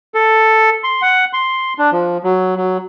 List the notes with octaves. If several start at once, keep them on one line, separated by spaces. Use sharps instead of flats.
A4
C6
F#5
C6
D4
F3
F#3
F#3